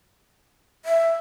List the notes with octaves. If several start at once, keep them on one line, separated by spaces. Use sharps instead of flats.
E5